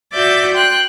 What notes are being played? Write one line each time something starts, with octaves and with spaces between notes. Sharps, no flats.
F#4 D5 E5 D6 G6
G5 C6 F#6